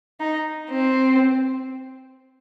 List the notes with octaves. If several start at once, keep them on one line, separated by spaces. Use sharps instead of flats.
D#4
C4